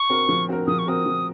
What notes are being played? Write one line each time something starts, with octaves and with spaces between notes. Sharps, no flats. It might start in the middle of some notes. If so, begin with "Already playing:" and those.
Already playing: C#6
C4 F#4 A#4
F3
C4 F#4 A#4
F3 D#6
C#6
C4 F#4 A#4 D#6
F3